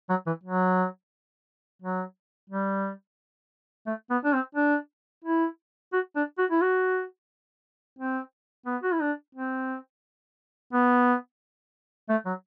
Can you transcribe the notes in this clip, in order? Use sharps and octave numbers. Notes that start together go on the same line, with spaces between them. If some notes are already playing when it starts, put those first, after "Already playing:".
F#3
E3
F#3
F#3
G3
A3
B3
D4
C4
D4
E4
F#4
D4
F#4
E4
F#4
C4
B3
F#4
E4
D4
C4
B3
A3
F#3